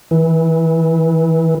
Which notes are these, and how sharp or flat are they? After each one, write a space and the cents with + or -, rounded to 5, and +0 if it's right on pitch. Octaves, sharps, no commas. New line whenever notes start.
E3 -20